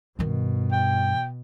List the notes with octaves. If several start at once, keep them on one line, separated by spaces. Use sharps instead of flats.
G2 B2 D#3
G5